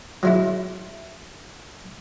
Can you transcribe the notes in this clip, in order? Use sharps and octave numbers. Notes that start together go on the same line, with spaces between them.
F#3 G#3 E4